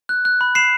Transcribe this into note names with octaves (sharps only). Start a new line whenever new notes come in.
F#6
F#6
B5
B5 C7 E7